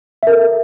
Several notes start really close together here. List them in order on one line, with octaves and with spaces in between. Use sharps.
E5 A#4 A4